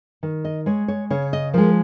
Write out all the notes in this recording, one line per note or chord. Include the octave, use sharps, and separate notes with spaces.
D#3
D#5
G#3 C#5
C#5
C#3 C#5
D#5
F3 G#3 A#4